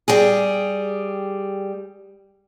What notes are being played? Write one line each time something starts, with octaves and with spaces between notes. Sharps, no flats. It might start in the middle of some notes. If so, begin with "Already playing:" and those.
G3 G4 G#4